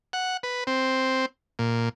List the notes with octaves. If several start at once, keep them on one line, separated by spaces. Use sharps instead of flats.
F#5
B4
C4
A#2